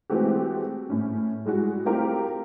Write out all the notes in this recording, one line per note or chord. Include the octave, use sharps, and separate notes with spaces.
E3 G#3 A3 C4 F#4 G4
A2 C#4
G3 G#3 E4 F#4
A3 C4 E4 F4 G4 A#4